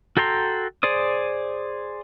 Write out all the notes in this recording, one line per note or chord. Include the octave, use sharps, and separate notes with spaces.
F#4 A4 G5 A#5 C6
G#4 C5 D5 D#6